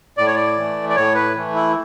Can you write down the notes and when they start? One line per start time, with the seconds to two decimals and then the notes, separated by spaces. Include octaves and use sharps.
0.18 A2 D5
0.26 C#5
0.35 D5
0.57 E3 A3
0.89 D5
0.96 A2 C#5
1.15 B4
1.35 E3 A3
1.55 E4